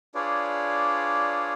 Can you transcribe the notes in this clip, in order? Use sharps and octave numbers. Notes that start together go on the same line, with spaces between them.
D4 F4 G#4 B4 C#5 D5